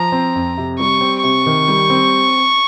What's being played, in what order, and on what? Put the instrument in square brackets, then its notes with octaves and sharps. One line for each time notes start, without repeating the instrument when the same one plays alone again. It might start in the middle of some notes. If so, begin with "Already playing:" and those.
Already playing: [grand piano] F3 [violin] A#5
[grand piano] C4
F2
C3
[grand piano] G3 [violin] C#6
[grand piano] C4
[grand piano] C3 [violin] C#6
[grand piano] D#3
G3
C4